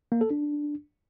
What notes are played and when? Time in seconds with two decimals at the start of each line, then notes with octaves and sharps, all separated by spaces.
0.12 A#3
0.21 A4
0.30 D4